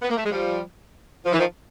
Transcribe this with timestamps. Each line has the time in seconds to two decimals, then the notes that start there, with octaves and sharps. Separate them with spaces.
0.02 B3
0.10 A#3
0.17 A3
0.24 G#3
0.31 F3 G3
1.25 F3
1.33 E3
1.39 D#3 F3